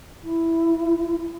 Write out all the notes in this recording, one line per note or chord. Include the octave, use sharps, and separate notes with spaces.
E4